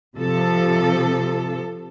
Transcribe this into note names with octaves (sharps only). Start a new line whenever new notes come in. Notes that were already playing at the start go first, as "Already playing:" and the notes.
C3 F3 A4